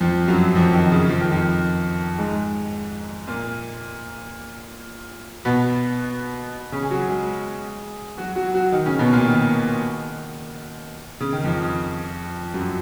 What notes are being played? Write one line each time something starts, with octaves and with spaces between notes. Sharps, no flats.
F2 F3
F#2 F#3
F2 F3
D#3
C#3
F3
D#3
F2 F3
G#2 G#3
A#2 A#3
B2 B3
C#3 C#4
G#4
F#3 F#4
G#3 G#4
F#3 F#4
F#3 F#4
F#3 F#4
D#3 D#4
C#3 C#4
B2 B3
A#2 A#3
D#3
C#3
D#3
F2 F3
F#2 F#3